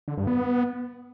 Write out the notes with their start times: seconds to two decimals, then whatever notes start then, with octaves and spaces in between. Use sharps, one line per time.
0.08 D3
0.17 G2
0.27 B3